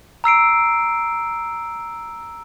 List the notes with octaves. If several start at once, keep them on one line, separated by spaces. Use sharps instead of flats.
A#5 E6 C7 D7